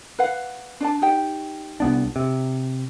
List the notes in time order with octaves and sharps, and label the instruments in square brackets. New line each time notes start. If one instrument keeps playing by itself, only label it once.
[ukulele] B4 F5 F#5
D4 D5 A5
D#4 G4 G5
[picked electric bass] C2 B3 D4
C3